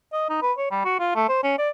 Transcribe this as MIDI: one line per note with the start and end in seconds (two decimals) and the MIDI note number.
0.13 0.25 75
0.30 0.39 63
0.42 0.53 71
0.58 0.70 73
0.71 0.80 55
0.85 0.98 66
0.99 1.13 65
1.16 1.26 57
1.29 1.39 72
1.43 1.57 61
1.58 1.69 74